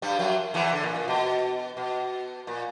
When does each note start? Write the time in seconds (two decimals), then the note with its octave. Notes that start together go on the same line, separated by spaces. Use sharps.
0.02 G2 G3
0.19 F#2 F#3
0.54 E2 E3
0.73 D3
0.83 A#2
0.96 A#2
1.08 B2
1.77 B2
2.47 A#2